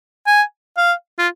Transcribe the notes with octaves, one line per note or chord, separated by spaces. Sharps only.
G#5
F5
F4